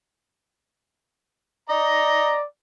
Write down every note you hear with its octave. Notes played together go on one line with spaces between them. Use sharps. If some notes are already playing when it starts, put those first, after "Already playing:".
D5 D#5 A#5